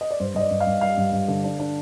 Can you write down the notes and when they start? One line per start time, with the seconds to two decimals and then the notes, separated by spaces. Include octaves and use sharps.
0.01 D#5
0.11 D5
0.20 G2 C5
0.35 G2 D#5
0.40 D5
0.51 G2
0.60 F5
0.67 G2
0.81 G3 F5
0.97 G2
1.12 G2
1.28 D3
1.44 D4
1.60 D4